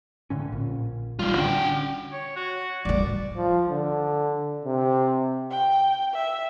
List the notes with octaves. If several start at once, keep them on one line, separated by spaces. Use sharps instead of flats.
A2 D3 C#4
A#1
A1 D#3 G3 F4
D3 C#4 D4 F#4 G5
C#5
F#4
D#3 G3 D5
F3
D3
C3
G5
E5